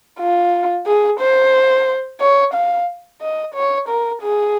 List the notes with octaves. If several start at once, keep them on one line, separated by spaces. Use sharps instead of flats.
F4
G#4
C5
C#5
F5
D#5
C#5
A#4
G#4